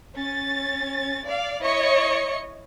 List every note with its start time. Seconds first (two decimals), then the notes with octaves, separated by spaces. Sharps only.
0.14 C#4 A6
1.25 D5 F5
1.63 E4 C#5 D#5 C#6 C#7